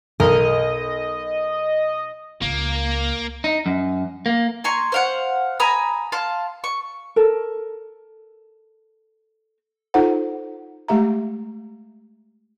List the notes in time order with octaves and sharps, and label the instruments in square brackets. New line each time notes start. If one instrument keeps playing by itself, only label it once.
[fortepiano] B1 [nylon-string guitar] A#4 [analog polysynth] D#5
[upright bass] C#2 [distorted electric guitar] A#3
[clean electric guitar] D#4
F#2
A#3
[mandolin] G#5 A#5 C6 C#6
C5 F5 F#5
G#5 A#5 B5 D#6
F5 A5 C6
C#6
[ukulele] A4 A#4
[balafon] D#4 F4 A4 C5 F#5 A#5
G#3 A3 G4 E5 A#5